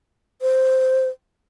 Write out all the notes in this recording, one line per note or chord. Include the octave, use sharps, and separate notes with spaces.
C5